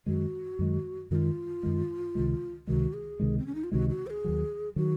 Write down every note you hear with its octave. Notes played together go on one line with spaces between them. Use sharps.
F#2 D#3 G#3 F#4
F#2 D#3 G#3
F#2 D#3 G#3 F4 F#4
F#2 D#3 G#3
C#2 C3 D#3 G#3
C#2 C3 D#3 G#3 F#4
G#4
C#2 C3 D#3 G#3
C4
C#4
D#4
F4
C#2 C3 D#3 G#3 F#4
F#4
C5
G#4
D#2 D#3 F#3
D#3 F#3 F#4